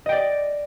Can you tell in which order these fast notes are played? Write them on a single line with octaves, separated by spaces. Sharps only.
D#5 G5 D5